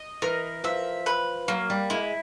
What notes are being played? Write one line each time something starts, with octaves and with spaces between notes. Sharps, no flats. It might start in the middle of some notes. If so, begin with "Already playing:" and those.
Already playing: D#5
E3 A#4
F3 E5
B4
F#3 A#3
G3
G#3 E4